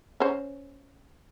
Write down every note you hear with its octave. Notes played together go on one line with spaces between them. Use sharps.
C#4 C5